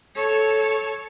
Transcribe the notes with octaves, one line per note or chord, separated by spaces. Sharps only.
A4 C#5